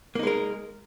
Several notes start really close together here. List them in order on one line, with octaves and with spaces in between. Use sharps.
A#3 D#4 G#3 A#4